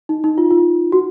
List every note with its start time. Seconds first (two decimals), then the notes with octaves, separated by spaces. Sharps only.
0.09 D#4
0.24 D#4
0.38 F4
0.51 F4
0.92 F#4